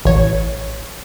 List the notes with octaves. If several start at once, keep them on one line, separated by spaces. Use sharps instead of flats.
A1 C#5